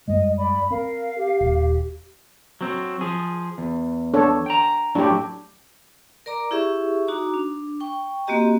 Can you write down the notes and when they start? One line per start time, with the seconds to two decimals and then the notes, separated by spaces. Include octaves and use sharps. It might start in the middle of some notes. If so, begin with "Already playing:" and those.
0.08 F#2 G3 G#3 D#5
0.38 D5 B5
0.71 C4 A#4 F5
1.18 G4
1.41 D#1
2.61 F#3 C4
3.01 F3 G#4
3.58 E2
4.14 D4 A4 C#5
4.46 G5 A#5
4.95 F#2 A2 F#3 D4 G4
6.26 A#4 D5 A#5 D6
6.51 E4 G4 G#4 E5 C#6
7.07 D#4 F#4 A#5 D6
7.34 D4
7.80 G5 C#6
8.27 A#3 C4 F#4 G4 D#5 A#5